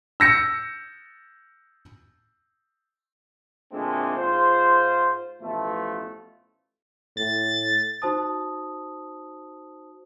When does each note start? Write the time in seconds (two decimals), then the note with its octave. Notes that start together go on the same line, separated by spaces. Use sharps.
0.20 E6 A#6 C#7
3.72 D2 A#2 G#3 A3 C4 D4
4.17 G#2 F4 C5
5.41 A1 B2 F3 A3
7.17 A2 A6
8.02 D#4 F#4 C5 A5 D#6